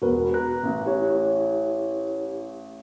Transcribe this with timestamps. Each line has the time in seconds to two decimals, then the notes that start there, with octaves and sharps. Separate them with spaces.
0.02 E1 F#4 A#4 B4
0.34 A#5 F#6
0.63 A1
0.86 E4 G4 C#5